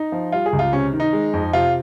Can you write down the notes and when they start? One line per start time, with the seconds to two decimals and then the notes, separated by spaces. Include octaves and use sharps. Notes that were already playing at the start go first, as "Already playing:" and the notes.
Already playing: D#4
0.12 F3
0.32 G3 F4
0.46 G#4
0.53 C#2
0.59 F4
0.72 C3 C#4
0.93 D#3
1.00 D#4
1.13 G#3
1.33 F2
1.53 C3 F4